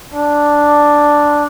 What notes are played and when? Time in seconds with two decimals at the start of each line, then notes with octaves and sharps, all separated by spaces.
0.14 D4